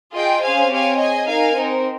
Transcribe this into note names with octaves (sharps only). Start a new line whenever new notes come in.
F4 G#4 D#5 G5
C#4 G#4 C5 F5 G#5
C4 G4 C#5 F5 G#5
G#4 D#5 G#5
D#4 A#4 F5 G#5
C4 D#4 A#4